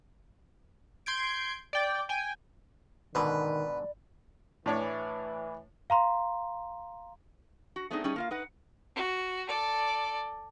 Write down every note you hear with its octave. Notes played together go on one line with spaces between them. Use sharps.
C6 G6 G#6 D7
D5 G5
G5 G#5
G#2 B2 D3 D#3 B4 D5
A2 E3 D4 C#5
F5 A#5 C6
F#4
A3 B3 C4 D4 D#4 G#4
G3 C#4 D#4 G#4
A#3 F4 F5
D#4 B4 F#5
F#4
A4 D5